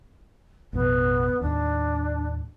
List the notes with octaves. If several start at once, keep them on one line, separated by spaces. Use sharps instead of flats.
A1 F2 B2 B3
D#2 A2 D4